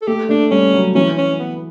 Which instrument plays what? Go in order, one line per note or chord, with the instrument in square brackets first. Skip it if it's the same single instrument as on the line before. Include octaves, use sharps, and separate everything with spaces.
[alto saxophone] A4
[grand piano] A3 [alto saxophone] G4
[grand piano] A3 [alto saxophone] D4
[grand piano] G3 [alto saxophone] C#4
[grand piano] F#3
[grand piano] E3 [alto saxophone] C#4
[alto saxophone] C#4
B3